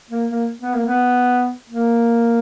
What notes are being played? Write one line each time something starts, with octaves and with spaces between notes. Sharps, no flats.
A#3
A#3
B3
A#3
B3
A#3